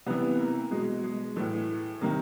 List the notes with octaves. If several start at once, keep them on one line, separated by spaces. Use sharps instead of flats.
C3 E3 B3
A#3
B2 G#3
G#3
A2 E3 A3
C3 D#3 A#3